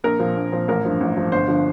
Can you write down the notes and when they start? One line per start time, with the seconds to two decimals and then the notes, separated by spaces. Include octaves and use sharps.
0.04 A#1 A#4
0.19 A#2 F3
0.36 A#1
0.52 A#2 F3
0.68 A1 A#4
0.85 G2 F3
1.00 A1
1.17 G2 F3
1.32 G1 C5
1.48 D3 F3